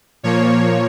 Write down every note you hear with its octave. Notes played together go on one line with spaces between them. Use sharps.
A#2 F3 A#3 C#5